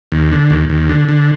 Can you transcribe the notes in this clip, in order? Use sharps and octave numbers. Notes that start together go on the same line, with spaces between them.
D#2
D3
D#2
D#2
D3
D3